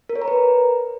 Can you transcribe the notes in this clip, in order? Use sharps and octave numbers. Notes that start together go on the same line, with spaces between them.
A#4
C#5
A#5
B4